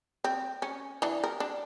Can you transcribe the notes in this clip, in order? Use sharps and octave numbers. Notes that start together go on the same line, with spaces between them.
C4
C#4
E3 D4
A#4
D4